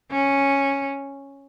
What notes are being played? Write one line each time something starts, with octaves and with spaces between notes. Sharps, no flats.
C#4